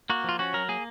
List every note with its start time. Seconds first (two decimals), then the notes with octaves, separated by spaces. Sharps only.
0.10 A#3 F#4
0.24 F3 F4
0.39 C#4 F#4
0.54 F#3 A#4
0.69 A#3 G#4